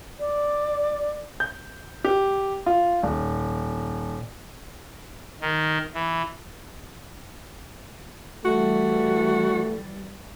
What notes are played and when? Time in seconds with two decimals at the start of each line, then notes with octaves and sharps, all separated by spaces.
0.19 D5
1.40 G6
2.04 G4
2.66 F4
3.03 D#1
5.41 D#3
5.94 E3
8.46 E3 G3 A3 F#4